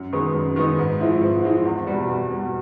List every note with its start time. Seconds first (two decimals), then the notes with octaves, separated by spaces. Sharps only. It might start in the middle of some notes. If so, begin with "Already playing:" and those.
Already playing: F#2
0.13 D#3 G#3 B3 D#4
0.35 F#2
0.56 D#3 G#3 B3 D#4
0.79 G#2
1.00 F3 G#3 C4 E4
1.21 G#2
1.43 F3 G#3 C4 E4
1.65 E2
1.87 B2 G3
2.09 E2
2.30 B2 G3